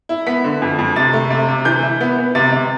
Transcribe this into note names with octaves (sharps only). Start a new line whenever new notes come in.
E4
B3 B6
D3
F2
F2
C3 A6
A3
C3
C3
E3 G6
E4
B3
B3
C3 A6
C3